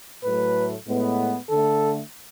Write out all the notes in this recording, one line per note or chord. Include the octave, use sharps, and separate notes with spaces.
A2 F#3 A3 B4
A2 G#3 B3
D3 A3 A4